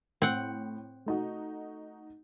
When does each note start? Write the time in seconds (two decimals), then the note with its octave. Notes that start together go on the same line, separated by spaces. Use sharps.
0.22 A2 C4 F#5
1.06 A3 D#4 F#4